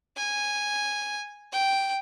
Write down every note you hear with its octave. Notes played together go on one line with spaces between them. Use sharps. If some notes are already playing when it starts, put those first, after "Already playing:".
G#5
G5